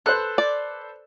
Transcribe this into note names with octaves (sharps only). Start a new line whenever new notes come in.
A4 B4 C5 F#6
D5